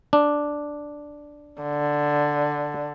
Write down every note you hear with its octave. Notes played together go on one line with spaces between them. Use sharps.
D4
D3